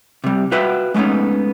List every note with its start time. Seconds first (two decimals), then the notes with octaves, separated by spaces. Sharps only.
0.24 C3 G3
0.52 F4 F#4 B4 E5 F#5 G5
0.94 G#3 A3 B3 C#4 D#4